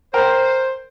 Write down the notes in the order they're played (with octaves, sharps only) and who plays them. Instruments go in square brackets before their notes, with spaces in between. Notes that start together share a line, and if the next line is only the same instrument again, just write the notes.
[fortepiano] A#4 G5 [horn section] C5